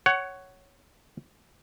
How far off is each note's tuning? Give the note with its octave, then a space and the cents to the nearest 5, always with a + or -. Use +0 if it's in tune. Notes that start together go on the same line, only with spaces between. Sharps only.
C#5 +0 F#5 +20